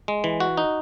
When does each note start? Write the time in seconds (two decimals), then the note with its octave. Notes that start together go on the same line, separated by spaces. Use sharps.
0.08 G#3
0.24 E3
0.40 F#4
0.57 D#4